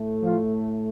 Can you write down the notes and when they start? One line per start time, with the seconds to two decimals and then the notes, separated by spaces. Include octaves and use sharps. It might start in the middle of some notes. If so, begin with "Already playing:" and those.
Already playing: A2 A3
0.22 F3 F4